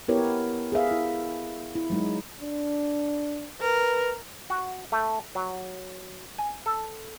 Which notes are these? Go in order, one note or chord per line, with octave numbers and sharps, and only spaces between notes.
B3 E4 G4 A#4 B4 C#5
G#4 B4 E5 F5
E4
E4
F#3 G#3 D#4
D4
A#4 B4
F#4
A3
F#3
G#5
A4